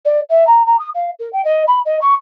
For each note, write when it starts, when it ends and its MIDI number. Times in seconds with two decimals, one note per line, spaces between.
0.05 0.20 74
0.29 0.46 76
0.47 0.64 82
0.66 0.76 82
0.79 0.88 87
0.94 1.10 77
1.19 1.31 70
1.33 1.44 79
1.44 1.63 75
1.67 1.79 83
1.85 1.99 75
2.01 2.14 85